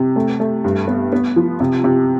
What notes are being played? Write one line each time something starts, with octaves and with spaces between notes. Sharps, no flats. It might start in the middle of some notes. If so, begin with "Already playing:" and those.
Already playing: C3
A3
A3
G2
B3
B3
F3
C3
C3